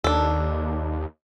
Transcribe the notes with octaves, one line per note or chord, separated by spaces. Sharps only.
D#2 D4 A4